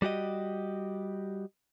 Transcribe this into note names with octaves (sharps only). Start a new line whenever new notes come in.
G3 F#4 G4 D#5